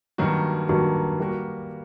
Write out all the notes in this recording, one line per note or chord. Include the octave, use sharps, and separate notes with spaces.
G2 D#3 F#3 A#3 F#4
G2 D#3 F#3 A#3 F#4
G3 A#3 F#4 A#4